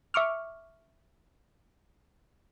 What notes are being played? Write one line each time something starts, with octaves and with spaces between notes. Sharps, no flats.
E5 C#6 D6 F6